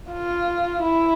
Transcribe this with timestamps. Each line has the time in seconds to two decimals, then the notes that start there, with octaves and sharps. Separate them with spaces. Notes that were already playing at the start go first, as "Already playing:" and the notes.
0.11 F4
0.83 E4